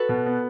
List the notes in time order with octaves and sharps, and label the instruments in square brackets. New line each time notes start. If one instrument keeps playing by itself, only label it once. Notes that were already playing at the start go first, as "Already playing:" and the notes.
Already playing: [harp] F#4 A4 B4
[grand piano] B2
B3